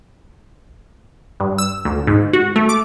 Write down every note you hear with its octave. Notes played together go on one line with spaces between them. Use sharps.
G2
E6
D2
G#2
F#4
A3
D6